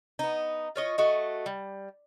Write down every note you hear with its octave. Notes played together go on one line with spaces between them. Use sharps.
B3 D#4
F4 C#5 D#5
A3 F#4 D#5
G3